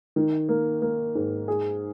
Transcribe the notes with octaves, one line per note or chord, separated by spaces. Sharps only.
D#3
A#3
A#3
G#2
G#4